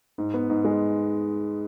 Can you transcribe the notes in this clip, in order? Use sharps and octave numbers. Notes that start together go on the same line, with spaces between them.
G#2
B3
G#2
G#3